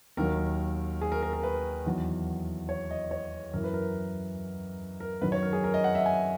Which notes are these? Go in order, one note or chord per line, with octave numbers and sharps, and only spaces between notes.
D#2 D#3 F#3 A#4
G#4
A#4
A#4
A#4
B4
E2 D#3 F#3
C#5
D#5
C#5
F#2 E3 A#4
B4
A#4
A#4
F#2 D#3 F#3 B4
C#5
A#4
G#4
A#4
D#5
F#5
E5
G#5